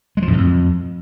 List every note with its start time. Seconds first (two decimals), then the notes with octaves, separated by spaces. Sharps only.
0.17 G#3
0.22 F3
0.28 F#2
0.33 A2
0.38 F2